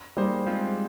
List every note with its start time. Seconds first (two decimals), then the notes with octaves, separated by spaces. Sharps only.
0.17 G3 A#3 D#4 G#4 C5
0.46 G#3 C4 F4 C5